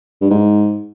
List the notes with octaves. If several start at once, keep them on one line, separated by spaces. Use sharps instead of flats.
G2
G#2